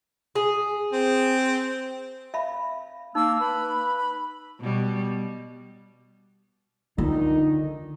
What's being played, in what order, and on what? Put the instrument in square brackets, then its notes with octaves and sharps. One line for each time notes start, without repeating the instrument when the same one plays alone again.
[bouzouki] G#4
[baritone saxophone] C4
[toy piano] E5 F5 B5
[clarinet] A#3 [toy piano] D#4 [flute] E6
[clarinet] B4 [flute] B5
[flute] B5
[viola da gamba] B2 G3
[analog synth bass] D3 [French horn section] D#3 D4 D#4 [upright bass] F4